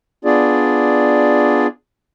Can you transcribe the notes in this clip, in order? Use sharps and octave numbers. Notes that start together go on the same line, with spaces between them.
B3 D4 F4 G#4 D5